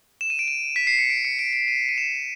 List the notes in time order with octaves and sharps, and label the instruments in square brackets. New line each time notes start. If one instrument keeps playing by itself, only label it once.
[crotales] E7
D#7
D7
D#7
B6
C7
C#7
D7
C#7
D7
D7
D#7
D#7
E7